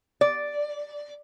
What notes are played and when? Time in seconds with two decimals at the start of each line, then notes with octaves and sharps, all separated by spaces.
0.21 D5